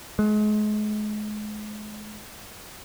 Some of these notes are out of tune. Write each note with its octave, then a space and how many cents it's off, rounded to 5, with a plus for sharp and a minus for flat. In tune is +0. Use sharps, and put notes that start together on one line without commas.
G#3 +35